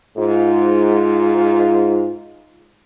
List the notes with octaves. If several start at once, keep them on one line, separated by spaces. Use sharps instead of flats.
G#2 F4